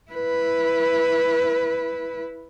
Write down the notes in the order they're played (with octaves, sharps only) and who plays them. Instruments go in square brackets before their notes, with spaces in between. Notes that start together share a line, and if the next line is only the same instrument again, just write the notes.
[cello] E4 B4